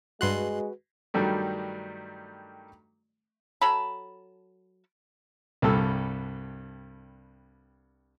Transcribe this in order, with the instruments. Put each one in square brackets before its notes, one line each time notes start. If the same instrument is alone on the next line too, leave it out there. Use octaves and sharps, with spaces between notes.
[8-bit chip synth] G2 C6 F#6 [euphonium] G#3 [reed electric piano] F#4 B4
[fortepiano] G2 D#3 F#3 G3 A3
[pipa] F#3 A4 A5 B5
[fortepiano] C2 G2 A4 E6